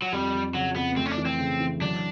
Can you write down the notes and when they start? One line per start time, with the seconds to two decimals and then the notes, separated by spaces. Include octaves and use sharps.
0.02 F#3
0.12 F2 G3
0.34 F2
0.55 C#3 F#3
0.75 F2 B3
0.97 A3 C4
1.06 C#4
1.11 D4
1.18 E3
1.25 C4
1.39 C#3
1.60 E3
1.81 F#3 D4